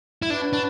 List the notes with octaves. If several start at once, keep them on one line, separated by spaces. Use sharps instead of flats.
E4
C#4 D4 F#4 B4
D4